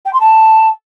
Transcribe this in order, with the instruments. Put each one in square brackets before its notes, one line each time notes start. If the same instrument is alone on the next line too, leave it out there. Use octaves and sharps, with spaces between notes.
[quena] G5
C6
A5